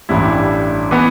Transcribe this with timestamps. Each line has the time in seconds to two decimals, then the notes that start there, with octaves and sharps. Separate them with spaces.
0.09 A1 G2 G3 E4
0.91 E3 B3